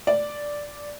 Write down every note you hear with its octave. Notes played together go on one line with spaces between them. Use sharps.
D5